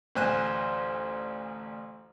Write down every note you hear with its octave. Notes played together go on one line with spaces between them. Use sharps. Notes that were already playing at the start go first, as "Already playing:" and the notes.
A1 D2 C5 G#5 F#6